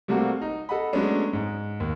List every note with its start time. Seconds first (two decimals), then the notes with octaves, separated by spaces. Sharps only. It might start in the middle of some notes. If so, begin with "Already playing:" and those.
0.08 C3 G3 A3 A#3 C4 F#4
0.42 D#4
0.69 A4 D#5 F#5 B5
0.93 F#3 G#3 A3 B3 C#4 D4
1.33 G#2
1.80 D#2